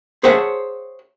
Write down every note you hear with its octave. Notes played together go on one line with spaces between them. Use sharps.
G#4 C5 C#5 E5 F#5 A5